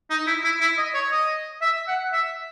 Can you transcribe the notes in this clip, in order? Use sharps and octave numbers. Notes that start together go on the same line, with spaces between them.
D#4
E4
E4
E4
D#5
C#5
D#5
E5
F#5
E5